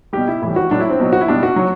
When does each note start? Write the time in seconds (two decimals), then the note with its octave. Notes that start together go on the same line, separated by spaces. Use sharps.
0.13 B2 G3 G4
0.28 E4
0.42 A2 E3 G3 E4
0.56 F#4
0.71 A2 F#3 D4
0.80 E4
0.90 C4
1.00 B2 F#3
1.13 F#4
1.21 E4
1.28 B2 G3 D4
1.43 F#4
1.56 F#3